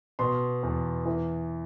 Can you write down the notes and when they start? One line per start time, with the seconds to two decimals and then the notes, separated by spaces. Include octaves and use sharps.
0.19 B2 C6
0.63 E2
1.05 E3